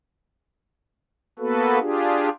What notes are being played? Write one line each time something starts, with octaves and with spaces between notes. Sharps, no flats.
A#3 B3 F#4 A4 B4
D4 F4 G4 G#4